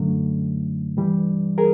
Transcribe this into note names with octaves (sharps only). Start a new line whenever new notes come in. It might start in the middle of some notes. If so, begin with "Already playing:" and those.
Already playing: F#2 D3 F#3 A3
G2 E3 G3
G#4 A#4